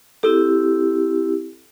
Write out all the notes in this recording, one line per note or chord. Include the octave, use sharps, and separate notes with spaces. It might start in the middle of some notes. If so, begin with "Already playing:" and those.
C4 E4 G4 A4